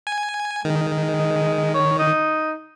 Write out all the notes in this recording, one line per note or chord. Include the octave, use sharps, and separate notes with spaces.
G#5
D#3 G#3
C#5
D#4